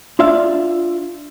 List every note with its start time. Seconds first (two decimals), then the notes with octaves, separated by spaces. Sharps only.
0.19 D4 F4 D5 E5 F5